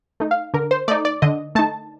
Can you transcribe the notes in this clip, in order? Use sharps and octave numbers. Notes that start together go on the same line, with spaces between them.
A3 D#4
F5
D3 A#4
C5
A3 D#4 D5
D5
D3 D#5
A3 D#4 A5